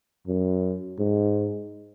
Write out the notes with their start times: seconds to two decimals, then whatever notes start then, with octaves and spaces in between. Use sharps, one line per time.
0.27 F#2
0.99 G#2